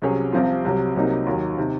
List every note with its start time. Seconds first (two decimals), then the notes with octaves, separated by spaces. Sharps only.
0.02 C2 C3 F#3 C#4 G#4
0.32 C2 C3 F3 C4 F4
0.65 C2 C3 F#3
0.95 C2 C3 F#3 A#3 D#4
1.26 D#2 D#3 F#3
1.57 C3 D#3